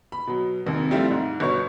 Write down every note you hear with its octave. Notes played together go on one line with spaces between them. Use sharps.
B5
B2 F#3
E1 D#2 C3
F3 G3 A3 C4 E4 F4
G#2
G1 B2 C#5 C#6